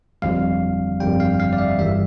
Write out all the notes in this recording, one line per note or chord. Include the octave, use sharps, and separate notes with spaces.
G1 F2 D3 G3 F5
G1 F2 D3 G3 G5
F5
F5
D5
E5
G1 G2 E3 G3 E5